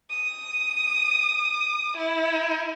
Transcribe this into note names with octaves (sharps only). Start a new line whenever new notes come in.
D#6
E4